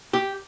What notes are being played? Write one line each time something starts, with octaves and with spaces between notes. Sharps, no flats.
G4